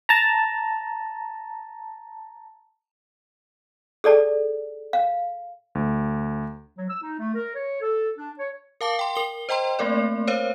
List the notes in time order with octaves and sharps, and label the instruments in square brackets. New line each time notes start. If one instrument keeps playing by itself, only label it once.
[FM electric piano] A5 A#5
[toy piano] G#4 A4 D5 A5
F5
[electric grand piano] D2
[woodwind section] F#3
E6
D#4
A3
A#4
C#5
A4
D4
C#5
[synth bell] A#4 F5 A5 D6
G5 C6
A#4 G7
C5 D#5 G5 A#5 C6
A3 A#3 C4 A#4 D5
A#4 C5 C#5 F5